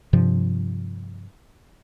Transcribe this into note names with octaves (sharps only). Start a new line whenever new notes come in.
G2 C3 F3